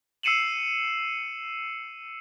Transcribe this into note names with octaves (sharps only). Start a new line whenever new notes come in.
E6 C7 C#7 D#7 E7 F#7